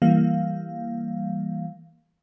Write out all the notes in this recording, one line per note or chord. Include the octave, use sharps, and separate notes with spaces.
E3 G3 A#3 F5